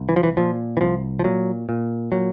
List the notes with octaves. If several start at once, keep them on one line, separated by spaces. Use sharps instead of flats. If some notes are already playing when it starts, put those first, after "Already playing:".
Already playing: C2
E3
F3
E3
A#2 F3
E3
C2 F3
F3
A#2 F#3
A#2
A#2 F#3